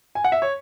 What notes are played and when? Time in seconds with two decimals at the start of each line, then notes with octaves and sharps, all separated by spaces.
0.15 G#5
0.25 F#5
0.32 E5
0.42 C#5